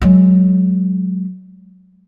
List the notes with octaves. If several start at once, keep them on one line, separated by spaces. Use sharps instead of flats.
F#3 G#3